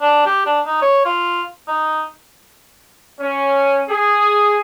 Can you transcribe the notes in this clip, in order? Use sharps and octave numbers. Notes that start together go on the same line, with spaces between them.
D4
G4
D4
D#4
C#5
F4
D#4
C#4
G#4